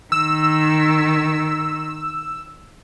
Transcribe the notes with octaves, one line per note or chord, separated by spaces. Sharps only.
D#3 E6